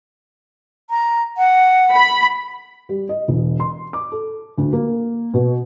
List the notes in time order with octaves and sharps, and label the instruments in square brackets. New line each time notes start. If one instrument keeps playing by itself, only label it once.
[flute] A#5
F#5
[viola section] B5
[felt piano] G3
D#5
E1
C6
D6
A4
D2
A#3
B2